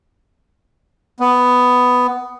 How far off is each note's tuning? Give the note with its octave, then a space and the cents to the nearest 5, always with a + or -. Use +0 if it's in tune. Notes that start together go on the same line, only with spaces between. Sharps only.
B3 +10